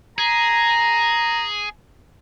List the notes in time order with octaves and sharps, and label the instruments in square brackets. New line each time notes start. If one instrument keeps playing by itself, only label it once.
[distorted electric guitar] G#4 [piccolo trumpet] A#5